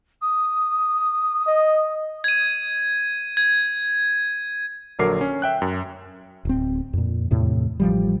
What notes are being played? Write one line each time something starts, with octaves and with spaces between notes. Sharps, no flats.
D#6
D#5
G#6 D#7
G#6
A#1 D3 F#3 A#4 D6 C7
C#4
E5 G5 F#6
F#2
D1 C4
F2 A#2
E2 A2 C3
A1 F3 G3